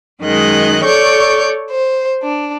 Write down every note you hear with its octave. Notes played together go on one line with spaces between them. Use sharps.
F#2 D#3 G#3 D#5 F#6
A4 C#5 D5 C#6 G6
C5
D4